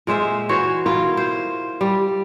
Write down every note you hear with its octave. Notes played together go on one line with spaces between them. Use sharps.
A#2 G#3 C5 E5
E3 F#4 C5 C#5
B2 E4 F4 A#4
C5
G3